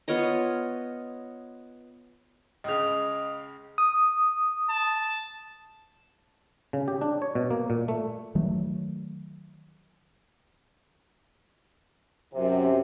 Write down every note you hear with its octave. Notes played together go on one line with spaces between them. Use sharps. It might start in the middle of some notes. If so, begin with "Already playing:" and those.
B3 F4 C#5 D#5
C#2 C#3 D#5 D#6 F7
D#6
A5
C#3
G4
D4
C#5
B2
A#3
A#2
A3
D#3 F#3 A3
F#2 C3